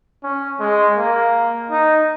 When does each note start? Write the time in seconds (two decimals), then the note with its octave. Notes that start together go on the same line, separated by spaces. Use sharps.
0.23 C#4
0.60 G#3
0.97 A#3
1.71 D#4